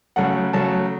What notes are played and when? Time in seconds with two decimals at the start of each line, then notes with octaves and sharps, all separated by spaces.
0.16 C#3 F#3 A3 F#5
0.53 C#3 F#3 A3 A5